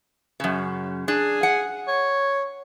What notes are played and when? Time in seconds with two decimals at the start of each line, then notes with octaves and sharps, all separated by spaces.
0.40 F#2 C#3
1.08 D4 G#4
1.43 F#5
1.87 C#5